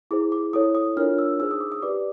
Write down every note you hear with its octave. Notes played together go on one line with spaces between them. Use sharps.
E4 G#4 C5 D6
D6
E4 A4 C#5 D#6
D#6
D4 F4 A#4 C#5 F6
E6
D#4 G#4 C5 E6
D#6
D6
D#6
G4 B4 D5 D6